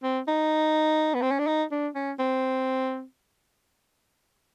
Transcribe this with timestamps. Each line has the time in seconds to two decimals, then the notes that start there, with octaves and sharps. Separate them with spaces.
0.03 C4
0.28 D#4
1.14 B3
1.22 C4
1.31 C#4
1.39 D4
1.47 D#4
1.71 D4
1.95 C#4
2.19 C4